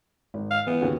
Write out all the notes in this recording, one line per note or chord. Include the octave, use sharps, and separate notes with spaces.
G#1
F5
E3 B3
D#2 C#3 F#4